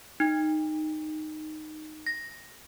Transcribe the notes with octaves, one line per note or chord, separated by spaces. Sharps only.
D#4
A#6